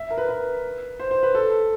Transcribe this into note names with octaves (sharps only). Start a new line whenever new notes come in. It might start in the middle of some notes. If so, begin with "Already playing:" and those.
Already playing: E5
A#4
B4
B4
C5
C5
B4
A4